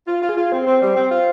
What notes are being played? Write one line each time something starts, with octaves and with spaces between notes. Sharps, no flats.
F4
F4
G#4
F4
C4 C5
C4
G3
C4
F4